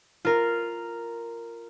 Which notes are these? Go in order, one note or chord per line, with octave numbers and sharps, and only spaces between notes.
F4 A#4